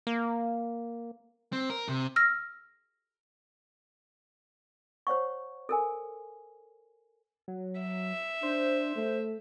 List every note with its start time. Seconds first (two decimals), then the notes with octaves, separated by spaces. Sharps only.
0.07 A#3
1.53 C4
1.70 A#4
1.89 C3
2.16 E6 F6 A#6
5.07 C5 C#5 F#5 C#6
5.69 A4 A#4 G#5
7.48 F#3
7.81 E5
8.43 D4 C5
8.96 A3